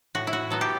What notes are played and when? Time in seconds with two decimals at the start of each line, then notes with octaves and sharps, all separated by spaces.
0.15 A2 F#4
0.27 E4
0.33 F#4
0.51 F#3 B3 A4
0.61 G4